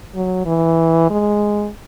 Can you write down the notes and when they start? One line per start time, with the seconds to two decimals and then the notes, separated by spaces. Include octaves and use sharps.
0.15 F#3
0.46 E3
1.10 G#3